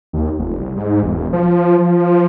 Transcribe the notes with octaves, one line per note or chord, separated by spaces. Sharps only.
D#2
F1
C2
G#2
E1
F3
F3